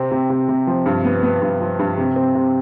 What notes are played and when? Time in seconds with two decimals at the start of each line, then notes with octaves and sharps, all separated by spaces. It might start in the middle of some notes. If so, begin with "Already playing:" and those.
Already playing: C3 C4
0.11 C3
0.30 C3
0.49 C3
0.67 F3
0.86 G2
1.05 B3
1.23 B3
1.42 G2
1.60 F3
1.79 G2
1.98 C3
2.16 C4
2.35 C3